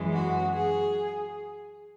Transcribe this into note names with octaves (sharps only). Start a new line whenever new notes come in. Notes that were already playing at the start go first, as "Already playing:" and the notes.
Already playing: F#2 E3 G#3
F#4
G#4